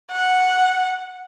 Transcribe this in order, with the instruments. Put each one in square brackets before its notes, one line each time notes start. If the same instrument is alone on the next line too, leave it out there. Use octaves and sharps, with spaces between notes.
[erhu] F#5